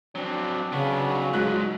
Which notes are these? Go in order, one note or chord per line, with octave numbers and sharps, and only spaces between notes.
F#3 C4 D4
C#3 F#3 B3
G#2 F#3 G#3 F#6